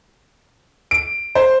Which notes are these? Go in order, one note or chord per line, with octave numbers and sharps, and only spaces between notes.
D7
C5